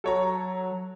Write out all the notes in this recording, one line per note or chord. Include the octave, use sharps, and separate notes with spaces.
F#3 A4 C#5 A#5